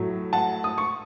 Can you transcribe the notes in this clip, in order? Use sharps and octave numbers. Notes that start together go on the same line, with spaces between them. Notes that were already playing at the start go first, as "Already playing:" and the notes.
Already playing: A2 F#3 A3
F#5 A5
D#6
C#6